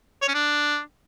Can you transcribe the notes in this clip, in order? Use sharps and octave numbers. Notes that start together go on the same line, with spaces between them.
C#5
C#4
D4